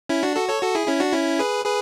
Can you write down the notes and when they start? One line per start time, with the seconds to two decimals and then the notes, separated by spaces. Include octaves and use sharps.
0.09 C#4 E4
0.23 D4 F#4
0.36 F#4 A4
0.49 A4 C#5
0.61 F#4 A4
0.75 E4 G#4
0.87 C#4 E4
1.00 D4 F#4
1.13 C#4 E4
1.39 G#4 B4
1.65 G#4 B4